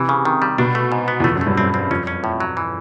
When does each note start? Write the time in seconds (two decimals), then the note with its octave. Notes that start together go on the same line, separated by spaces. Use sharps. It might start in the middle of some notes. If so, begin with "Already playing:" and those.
Already playing: C3 E3
0.09 C#3
0.25 D#3
0.42 G3
0.58 B2 D4
0.75 A3
0.92 G#2
1.08 B3
1.20 E2
1.24 F2 A3
1.35 F#2
1.41 A3
1.47 G2
1.57 G2 C4
1.74 C4
1.91 F2 C#4
2.07 C#4
2.24 A2
2.40 F#3
2.57 E3